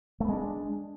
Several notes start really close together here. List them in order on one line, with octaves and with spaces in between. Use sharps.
A3 B3 G#3 D4